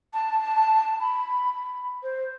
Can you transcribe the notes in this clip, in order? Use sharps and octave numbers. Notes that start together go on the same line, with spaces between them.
A5
B5
C5